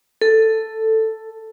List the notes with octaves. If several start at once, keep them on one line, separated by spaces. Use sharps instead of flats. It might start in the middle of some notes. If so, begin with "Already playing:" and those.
A4